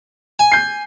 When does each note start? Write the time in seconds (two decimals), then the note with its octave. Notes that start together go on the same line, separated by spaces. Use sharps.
0.39 G#5
0.52 G6 C7